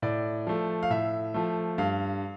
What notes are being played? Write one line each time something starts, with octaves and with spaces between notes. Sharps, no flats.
A2 D5
F3 A3
F5
A2 E5
F3 A3
G2 F5